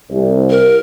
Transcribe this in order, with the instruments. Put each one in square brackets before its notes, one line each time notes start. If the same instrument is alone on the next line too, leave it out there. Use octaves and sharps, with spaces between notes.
[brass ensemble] C2
[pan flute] A#4